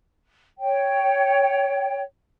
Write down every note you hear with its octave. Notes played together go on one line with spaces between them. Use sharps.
C#5 G5